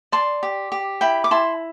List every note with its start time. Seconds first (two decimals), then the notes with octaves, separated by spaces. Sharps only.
0.12 D5 A5 C6
0.43 G4
0.72 G4
1.01 E4 G5 B5
1.24 D6
1.31 E4 A5 C6